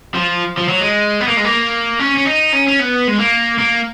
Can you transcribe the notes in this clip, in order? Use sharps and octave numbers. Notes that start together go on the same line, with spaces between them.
F3
F3
F#3
G#3
B3
A#3
G#3
A#3
C#4
C#4
D#4
C#4
C#4
B3
G#3
A#3
A#3